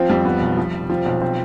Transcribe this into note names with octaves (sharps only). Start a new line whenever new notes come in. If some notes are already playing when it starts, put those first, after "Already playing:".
Already playing: F3 C4
F2 G3
B3
B1
F3
F1
F3 C4
B1
C4